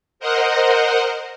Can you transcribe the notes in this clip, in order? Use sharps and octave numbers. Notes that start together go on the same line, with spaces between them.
A#4 C5 D#5 F#5